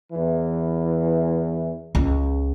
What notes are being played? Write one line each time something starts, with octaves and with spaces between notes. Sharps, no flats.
E2 E3
C#2